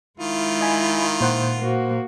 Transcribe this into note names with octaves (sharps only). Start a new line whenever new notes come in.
D#3 G#3 E4 F4
D#5 G#5 B5
A#2 C5 F#5
A#3 F#4